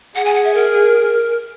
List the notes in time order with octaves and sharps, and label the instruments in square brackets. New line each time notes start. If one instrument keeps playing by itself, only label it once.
[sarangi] G#4 [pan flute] F#5
[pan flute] G#5
F#5
E5
A#4